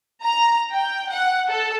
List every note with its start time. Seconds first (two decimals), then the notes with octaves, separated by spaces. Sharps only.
0.23 A#5
0.74 G5
1.10 F#5
1.48 A4